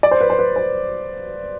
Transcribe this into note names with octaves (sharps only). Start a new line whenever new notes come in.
D5
C5
B4
C5
B4
C5